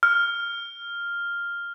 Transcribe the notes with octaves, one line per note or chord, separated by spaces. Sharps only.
F6